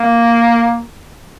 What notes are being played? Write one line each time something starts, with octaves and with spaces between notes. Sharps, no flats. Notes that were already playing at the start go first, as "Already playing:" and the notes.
Already playing: A#3